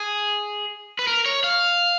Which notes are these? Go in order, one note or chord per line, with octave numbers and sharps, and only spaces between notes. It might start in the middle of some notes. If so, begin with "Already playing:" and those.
Already playing: G#4
B4
A#4
C#5
F5